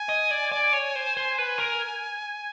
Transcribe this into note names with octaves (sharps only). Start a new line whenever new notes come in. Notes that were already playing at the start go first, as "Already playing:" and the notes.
Already playing: G#5
D#5
D5
D5
C#5
C5
C5
B4 G#5
A#4